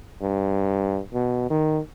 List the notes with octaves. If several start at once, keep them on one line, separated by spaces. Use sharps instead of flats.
G2
B2
D#3